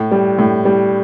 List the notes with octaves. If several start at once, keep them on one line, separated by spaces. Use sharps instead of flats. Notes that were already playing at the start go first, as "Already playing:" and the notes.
Already playing: A2
G3
A2
G3